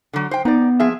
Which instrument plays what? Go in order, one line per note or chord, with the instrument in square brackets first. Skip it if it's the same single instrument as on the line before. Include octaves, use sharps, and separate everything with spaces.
[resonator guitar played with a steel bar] D3 F#3
C5 G5
[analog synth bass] B3 [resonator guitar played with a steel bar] D#4 D5
[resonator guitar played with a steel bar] F3 G#4 E5